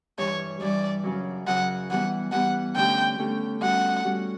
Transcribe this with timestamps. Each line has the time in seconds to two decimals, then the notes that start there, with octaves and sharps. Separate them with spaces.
0.18 G2 E3 G3 C#5
0.61 G2 E3 G3 D5
1.04 F#2 C#3 F#3
1.47 F#2 C#3 F#3 F#5
1.90 E3 G3 B3 F#5
2.32 E3 G3 B3 F#5
2.75 D3 A3 C#4 G4 G5
3.19 D3 A3 C#4 G4
3.61 G3 C#4 F#4 F#5
4.04 G3 C#4 F#4